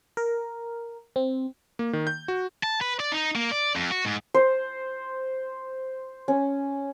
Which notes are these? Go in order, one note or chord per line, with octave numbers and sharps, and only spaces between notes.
A#4
C4
A#3
D#3
G6
F#4
A5
B4
D5
D#4
A#3
D5
F2
F#4
G#2
C5
C#4